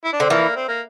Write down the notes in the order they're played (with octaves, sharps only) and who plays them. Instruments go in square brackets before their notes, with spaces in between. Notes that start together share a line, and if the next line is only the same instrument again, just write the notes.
[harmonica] E4
D4
[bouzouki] D3 [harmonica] C4
[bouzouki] E3 [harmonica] F3 A#3
[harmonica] C4
A#3